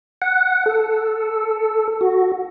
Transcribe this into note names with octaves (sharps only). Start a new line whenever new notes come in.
F#5
A4
F#4